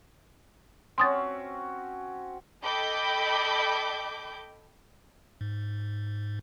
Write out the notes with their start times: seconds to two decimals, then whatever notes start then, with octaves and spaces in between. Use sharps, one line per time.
0.98 C4 C#4 F#4 C6 D#6 A6
2.64 A4 D#5 G5 B5 D6 G6
5.41 G#2